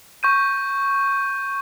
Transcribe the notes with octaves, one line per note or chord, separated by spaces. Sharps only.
C#6 G6 D#7